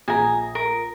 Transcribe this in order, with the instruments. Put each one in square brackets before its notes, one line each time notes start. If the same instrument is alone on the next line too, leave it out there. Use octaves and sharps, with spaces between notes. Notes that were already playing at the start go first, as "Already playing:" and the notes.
[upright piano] A#1 G#4 D#6 [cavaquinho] G#5 A#5
[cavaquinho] A#4